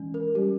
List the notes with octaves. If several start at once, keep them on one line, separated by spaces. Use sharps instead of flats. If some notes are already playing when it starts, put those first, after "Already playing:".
Already playing: E3 G#3 C#4
A#4
G3 C#4 G4